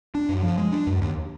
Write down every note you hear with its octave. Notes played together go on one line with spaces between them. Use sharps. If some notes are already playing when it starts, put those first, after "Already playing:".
D4
F#2
F3
G#3
D4
F#2
D#2